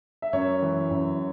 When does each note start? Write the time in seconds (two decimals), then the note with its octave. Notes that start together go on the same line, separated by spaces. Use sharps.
0.22 E5
0.33 F#2 C#5
0.62 E3
0.91 F#2